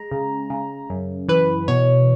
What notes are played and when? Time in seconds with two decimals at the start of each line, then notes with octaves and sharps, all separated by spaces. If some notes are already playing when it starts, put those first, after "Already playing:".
Already playing: G#3 A#5
0.11 C#3
0.50 C#3
0.90 F#2
1.28 E3 B4
1.68 B2 C#5